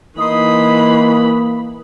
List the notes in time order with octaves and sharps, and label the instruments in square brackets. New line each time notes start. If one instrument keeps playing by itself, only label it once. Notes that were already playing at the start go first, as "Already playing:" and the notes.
[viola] E3 B5 [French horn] A#3 [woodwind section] D#4 C6 D#6